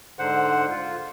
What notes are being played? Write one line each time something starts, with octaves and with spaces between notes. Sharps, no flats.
G#2 D3 C5 F#5
F4